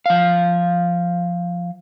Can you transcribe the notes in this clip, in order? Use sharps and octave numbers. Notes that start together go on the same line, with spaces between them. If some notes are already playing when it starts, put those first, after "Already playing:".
F3 F5